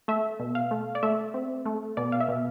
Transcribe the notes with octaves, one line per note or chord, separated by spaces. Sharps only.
A3 E5
B2
F5
A3
D5
A3 E5
C4
A3
B2 D5
F5
E5
B2